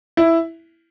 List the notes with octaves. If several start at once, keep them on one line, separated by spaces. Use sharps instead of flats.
E4